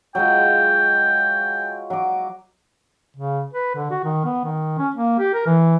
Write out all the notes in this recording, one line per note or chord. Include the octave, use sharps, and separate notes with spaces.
F#3 G#3 F4 G5
F#3 D6
C#3
B4
D3
F#4
D#3
B3
D#3
C#4
A#3
G4
A#4
E3